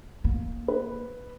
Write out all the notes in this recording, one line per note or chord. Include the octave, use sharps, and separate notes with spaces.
A#3
B4